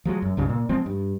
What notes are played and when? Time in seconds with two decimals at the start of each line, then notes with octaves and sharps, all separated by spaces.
0.05 F3 F#3 G#3
0.22 F#2
0.37 C#2 G2 C#3
0.49 A#2
0.69 F3 G#3 C4
0.86 G2